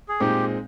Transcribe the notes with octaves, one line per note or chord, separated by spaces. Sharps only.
G#4
A#2 G#3 C4 D#4 G4